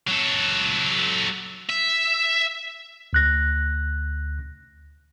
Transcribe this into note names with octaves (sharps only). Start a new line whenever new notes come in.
F#3 A4
E5
D2 F#6 A#6